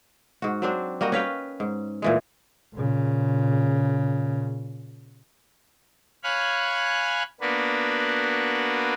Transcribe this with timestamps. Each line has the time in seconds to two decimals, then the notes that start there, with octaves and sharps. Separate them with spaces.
0.42 G#2 F#4
0.62 F#3 C4 D4
1.01 G3 A#3 F#4 D#5
1.12 C#4 B4 F5 G5
1.60 G#2
2.02 A#2 E3 G#3
2.73 A#2 C#3
6.23 C#5 F5 G#5 B5 F#6
7.41 A#3 B3 D4 F#4 B4